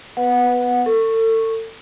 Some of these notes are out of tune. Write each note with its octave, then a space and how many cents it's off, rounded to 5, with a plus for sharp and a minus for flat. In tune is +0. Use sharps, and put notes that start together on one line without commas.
B3 +10 B4 +0 F#5 -15
A4 +35 C#6 -5